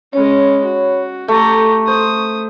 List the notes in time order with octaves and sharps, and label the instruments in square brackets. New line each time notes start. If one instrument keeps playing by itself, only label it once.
[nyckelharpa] G#3 C#4 [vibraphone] C#5 B5
[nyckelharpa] F#4
[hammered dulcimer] A3 [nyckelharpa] G4 A#5 [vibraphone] A4
[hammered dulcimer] C5 [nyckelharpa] D#6